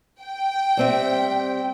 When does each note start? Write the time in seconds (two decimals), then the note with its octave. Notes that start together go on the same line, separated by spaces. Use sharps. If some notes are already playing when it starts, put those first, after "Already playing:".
0.21 G5
0.77 G3 C4 E5